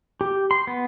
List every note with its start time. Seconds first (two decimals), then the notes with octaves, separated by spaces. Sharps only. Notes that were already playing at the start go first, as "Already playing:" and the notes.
0.21 G4
0.51 C6
0.67 B3